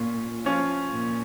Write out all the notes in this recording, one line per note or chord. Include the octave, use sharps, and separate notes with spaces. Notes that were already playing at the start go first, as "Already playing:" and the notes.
Already playing: A#2 C#4 F4
F3 C#4 F4
A#2